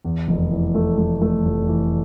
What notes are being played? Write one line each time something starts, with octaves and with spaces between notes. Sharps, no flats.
E2
F1
E3
A3
A3
A3
F1
E3